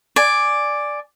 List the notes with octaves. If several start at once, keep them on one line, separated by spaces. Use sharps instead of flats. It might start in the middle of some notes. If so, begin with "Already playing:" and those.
D5 G#5